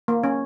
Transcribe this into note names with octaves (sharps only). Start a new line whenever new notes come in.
A#3
C#4